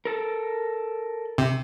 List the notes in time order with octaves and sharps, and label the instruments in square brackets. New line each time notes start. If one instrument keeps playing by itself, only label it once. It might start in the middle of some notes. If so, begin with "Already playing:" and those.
[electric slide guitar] A4 A#4
[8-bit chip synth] C3